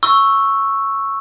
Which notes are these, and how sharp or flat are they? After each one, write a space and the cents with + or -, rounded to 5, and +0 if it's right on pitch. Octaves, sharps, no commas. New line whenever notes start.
C#6 -5 E6 +0